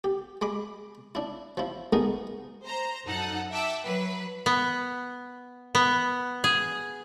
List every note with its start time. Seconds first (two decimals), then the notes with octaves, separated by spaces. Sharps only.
0.04 G4
0.42 G#3 B5 D6
1.15 D4 E4
1.57 F3 E4
1.93 G#3 A3 B3 D#4 G#4 A#4
2.64 C5 A#5
3.05 F#2 D#4 A4 F#5
3.51 E5 F#5 G5 A5 D6 E6
3.84 F#3 B4
4.46 B3
5.75 B3
6.44 G#4